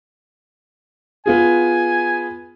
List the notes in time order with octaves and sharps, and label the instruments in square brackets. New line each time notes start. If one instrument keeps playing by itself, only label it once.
[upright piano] B3 F4 G#4 [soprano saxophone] G#5